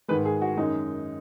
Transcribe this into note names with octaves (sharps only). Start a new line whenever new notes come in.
G#2 D#3 G#3 B4
G#4
F#4
F#2 D#3 G#3 D#4